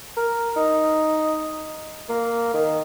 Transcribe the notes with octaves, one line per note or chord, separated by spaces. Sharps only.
A#4
D#4
A#3
D#3